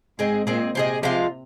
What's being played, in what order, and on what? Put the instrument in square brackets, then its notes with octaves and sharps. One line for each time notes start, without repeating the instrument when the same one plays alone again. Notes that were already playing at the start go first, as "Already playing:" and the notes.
[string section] G#2 [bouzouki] C4 G#4 D#5
[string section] A#2 [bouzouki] C4 G#4 D#5
[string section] C3 [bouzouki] C4 G#4 D#5
[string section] C3 [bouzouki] F3 G#3 F4